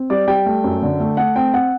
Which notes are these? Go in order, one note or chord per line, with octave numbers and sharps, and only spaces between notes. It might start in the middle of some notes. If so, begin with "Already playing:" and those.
Already playing: C4
G3 D5
G3 G5
A3
F#2
D3
A3
A3 F#5
C4 G5
C4 F#5